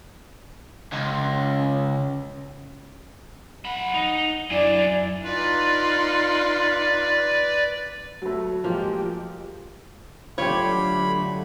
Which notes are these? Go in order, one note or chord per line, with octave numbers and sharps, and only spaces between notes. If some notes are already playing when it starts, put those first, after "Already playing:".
C#2
C#4
F#3 F#5 B5
D#4
F#2 F#3 D4 E4 D5 G#5
D#4 F4 B4 D5
F#3 A3
F3 G#3 A#3 G4
D3 F#3 A3 F4 G4 C#5 B5